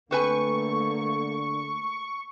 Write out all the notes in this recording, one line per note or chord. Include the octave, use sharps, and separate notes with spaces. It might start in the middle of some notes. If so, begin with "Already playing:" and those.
D3 A3 A#3 C4 B4 G#5 C#6